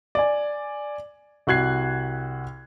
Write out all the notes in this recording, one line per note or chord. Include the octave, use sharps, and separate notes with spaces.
D5 G#5
C2 F#4 F#6 G#6 C7